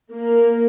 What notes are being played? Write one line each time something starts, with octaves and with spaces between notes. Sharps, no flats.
A#3